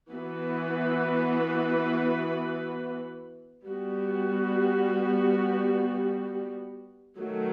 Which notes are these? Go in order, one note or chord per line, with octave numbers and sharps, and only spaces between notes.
E3 B3 F#4 B4
G3 B3 F#4
D#3 F#3 A3